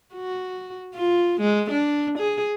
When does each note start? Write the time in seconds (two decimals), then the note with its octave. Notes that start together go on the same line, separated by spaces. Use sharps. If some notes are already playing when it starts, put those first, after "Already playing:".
0.14 F#4
0.95 F4
1.40 G#3
1.70 D4
2.18 G#4